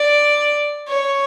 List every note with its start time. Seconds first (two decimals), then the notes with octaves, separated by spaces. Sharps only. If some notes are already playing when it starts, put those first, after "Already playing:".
Already playing: D5
0.88 C#5